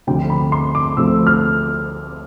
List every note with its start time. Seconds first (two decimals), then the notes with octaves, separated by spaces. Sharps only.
0.07 D2 D3 F3 A3 G5
0.30 B5
0.52 C6
0.75 D6
0.97 D2 D3 F3 A3 E6
1.27 F6